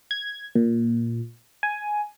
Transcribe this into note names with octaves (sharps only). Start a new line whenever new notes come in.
G#6
A#2
G#5